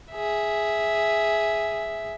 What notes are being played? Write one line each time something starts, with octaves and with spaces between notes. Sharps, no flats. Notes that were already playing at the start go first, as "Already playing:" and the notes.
G#4 E5